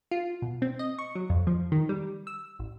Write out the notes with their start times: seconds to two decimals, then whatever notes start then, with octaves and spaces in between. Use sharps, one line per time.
0.11 F4
0.42 B2
0.62 C4
0.79 D#5
0.99 C#6
1.15 F#3
1.30 F2
1.47 F3
1.72 D#3
1.89 G3
2.27 E6
2.59 A1